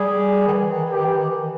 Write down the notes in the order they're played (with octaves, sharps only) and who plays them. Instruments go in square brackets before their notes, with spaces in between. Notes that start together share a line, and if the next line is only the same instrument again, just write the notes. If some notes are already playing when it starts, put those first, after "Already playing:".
Already playing: [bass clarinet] G3 [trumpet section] G#4
[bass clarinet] D#3
E3
D#3
E3
[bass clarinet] D#3 [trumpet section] G4
[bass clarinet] E3
D#3
E3